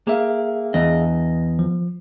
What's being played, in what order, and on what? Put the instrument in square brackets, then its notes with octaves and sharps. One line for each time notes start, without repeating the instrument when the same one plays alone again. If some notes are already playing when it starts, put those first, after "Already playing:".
[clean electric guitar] A#3 [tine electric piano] G#4 E5 F5
[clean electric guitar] E2 D#5
[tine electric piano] F3